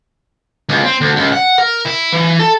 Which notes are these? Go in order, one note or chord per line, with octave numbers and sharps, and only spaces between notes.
C#2
C4
D2
C#2
F#5
A#4
E4
E3
A4